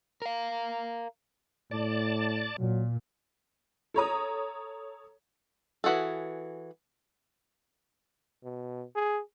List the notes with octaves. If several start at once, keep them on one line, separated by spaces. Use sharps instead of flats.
A#4 F5
A2 D5 A5
A#2 F#3
A4 C#5 A#5 D#6
E3 F#4 G#4 A4
B2
G#4